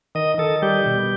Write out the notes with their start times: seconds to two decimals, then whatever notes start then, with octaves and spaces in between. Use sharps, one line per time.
0.15 D#3 D#5
0.38 D#3 A4
0.62 G3 G4
0.86 B2